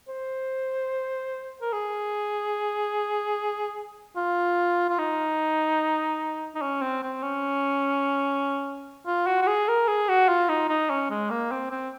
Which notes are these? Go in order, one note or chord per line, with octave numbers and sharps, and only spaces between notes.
C5
A#4
G#4
F4
F4
D#4
D#4
C#4
C4
C4
C#4
F4
F#4
F#4
G#4
A#4
G#4
F#4
F4
D#4
D#4
C#4
G#3
A#3
C4
C4